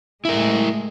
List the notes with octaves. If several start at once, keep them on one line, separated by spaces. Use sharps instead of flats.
A2 G#3 E4 A#4